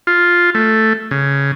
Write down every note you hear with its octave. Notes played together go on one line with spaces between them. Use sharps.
F4
A3
C#3